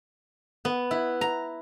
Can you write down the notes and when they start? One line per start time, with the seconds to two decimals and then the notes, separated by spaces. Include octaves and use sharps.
0.65 B3
0.91 E4
1.21 A#5